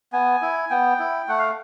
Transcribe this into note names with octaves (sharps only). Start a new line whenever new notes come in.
B3 G#5
E4
B3 G5
E4
A3 F#5
F5